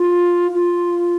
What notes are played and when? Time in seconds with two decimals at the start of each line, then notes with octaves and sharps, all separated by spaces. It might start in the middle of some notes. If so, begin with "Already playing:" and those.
Already playing: F4
0.54 F4